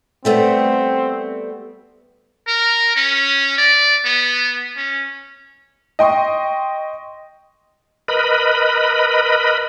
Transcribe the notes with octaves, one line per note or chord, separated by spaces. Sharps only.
G3 A3 B3 C4
A#4
C#4
D5
B3
C#4
D#5 G5 C6 C#6 D#6
A#4 B4 D#5 B5